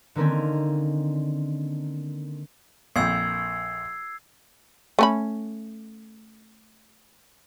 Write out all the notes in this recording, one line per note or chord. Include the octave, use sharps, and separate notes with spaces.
D3 D#3 A#3 C4 C#4
A#1 F2 E6 G#6 C7
A3 C#4 B5